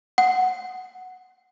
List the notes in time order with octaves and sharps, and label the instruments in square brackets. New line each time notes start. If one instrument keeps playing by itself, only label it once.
[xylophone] F#5